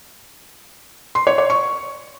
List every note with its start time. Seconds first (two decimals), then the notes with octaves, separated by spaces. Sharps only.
1.15 C6
1.27 C#5
1.38 C#5
1.50 C#6